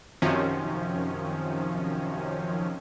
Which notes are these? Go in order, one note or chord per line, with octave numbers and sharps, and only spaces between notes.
F#2 C3 D#3 F3 C#4